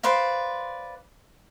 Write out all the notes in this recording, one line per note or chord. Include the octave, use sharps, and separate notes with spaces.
B4 C5 D5 F5